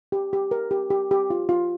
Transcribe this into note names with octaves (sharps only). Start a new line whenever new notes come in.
G4
G4
A#4
G4
G4
G4
F4
F4